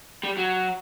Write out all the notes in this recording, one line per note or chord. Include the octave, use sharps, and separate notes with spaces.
G3
F#3